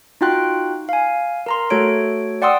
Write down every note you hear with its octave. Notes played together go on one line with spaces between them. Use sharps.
D#4 F4 F#4 G5 C6 F#6
F5 G#5
A#4 A#5 C6
A3 F#4 A4 C#5 D7
D5 F#5 G5 C6 D#6 E6